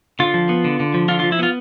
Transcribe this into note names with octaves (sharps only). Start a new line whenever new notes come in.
D3 F4
F3
B3
D3
D3
F3
D3 F4
F3 F4
E4
B3 F4